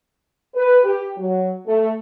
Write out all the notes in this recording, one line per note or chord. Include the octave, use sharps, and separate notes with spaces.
B4
G4
F#3
A3